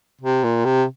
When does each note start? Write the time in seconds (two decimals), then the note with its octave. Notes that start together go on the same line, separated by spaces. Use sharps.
0.21 C3
0.44 A#2
0.65 C3